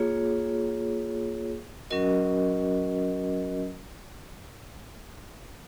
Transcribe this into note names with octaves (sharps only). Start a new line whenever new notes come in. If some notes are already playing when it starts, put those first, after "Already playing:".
Already playing: A#3 F4 G#4 C#5
F#3 C#4 F#4 A#4 D#5